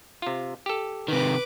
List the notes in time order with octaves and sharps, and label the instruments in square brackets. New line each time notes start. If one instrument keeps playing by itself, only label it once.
[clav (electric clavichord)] C3 F4
G4 A4
[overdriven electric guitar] C3 D#3 [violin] B4 D6